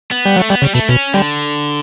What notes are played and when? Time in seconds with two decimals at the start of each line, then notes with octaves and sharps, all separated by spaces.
0.11 B3
0.25 G3
0.37 F#3 A3
0.49 G3 B3
0.62 C#3 G3
0.75 B2 A3
0.88 B2 C#4
1.14 D3 G3